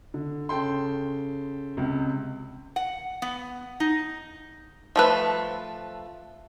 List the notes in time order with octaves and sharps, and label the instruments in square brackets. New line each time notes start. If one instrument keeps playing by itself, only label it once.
[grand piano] D3
C#3 A4 G5 C6
C#2 C3
[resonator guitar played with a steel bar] F#5
B3
D#4
[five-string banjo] F3 A3 B4